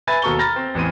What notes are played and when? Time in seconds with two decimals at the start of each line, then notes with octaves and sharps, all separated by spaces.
0.07 B4 E5 G#5 B5 A6
0.22 D#2 B2 A4 A#5 C#6 G7
0.39 A#5 B5 F6 A6 A#6
0.56 C4
0.74 A1 E2 C4 D#7